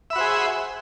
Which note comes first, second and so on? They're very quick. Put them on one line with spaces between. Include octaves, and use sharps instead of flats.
E5 B5 F#4 C5 G#4